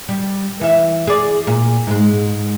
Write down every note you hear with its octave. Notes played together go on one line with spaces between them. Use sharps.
G3
E3 E5
G#4 D5
A#2
G#2 G#3